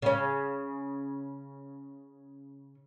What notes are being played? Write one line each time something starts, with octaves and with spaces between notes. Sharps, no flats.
C#3 C#4